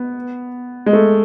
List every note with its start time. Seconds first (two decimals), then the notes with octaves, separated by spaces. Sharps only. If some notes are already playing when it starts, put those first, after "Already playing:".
Already playing: B3
0.86 G#3
0.93 A3